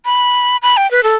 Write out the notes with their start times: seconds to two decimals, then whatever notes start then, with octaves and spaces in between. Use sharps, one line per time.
0.05 B5
0.62 B5
0.77 G5
0.91 B4
1.03 A4